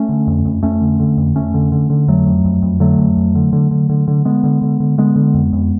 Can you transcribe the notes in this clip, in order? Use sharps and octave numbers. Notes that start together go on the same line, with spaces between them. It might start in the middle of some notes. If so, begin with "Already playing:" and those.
Already playing: A3 C#4
D3
F2
F2
F2 A3 C#4
D3
D3
F2
F2 A3 C#4
D3
D3
D3
F2 F#3 A3
F2
F2
F2
D3 F#3 A3
F2
F2
D3
D3
D3
D3
D3
D3 G#3 B3
D3
D3
D3
D3 G#3 B3
D3
F2
F2